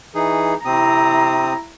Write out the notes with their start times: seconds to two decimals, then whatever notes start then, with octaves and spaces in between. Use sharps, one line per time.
0.15 E3 D#4 G#4
0.65 C3 C4 E4 A#5 D#6